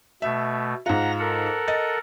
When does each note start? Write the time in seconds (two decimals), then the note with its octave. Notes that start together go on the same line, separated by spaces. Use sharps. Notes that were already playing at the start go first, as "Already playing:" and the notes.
0.22 B2 A3 E5
0.86 G#2 F4 F#5 A#5 A#6
1.19 A4 A#4 F#5
1.68 D#5 A6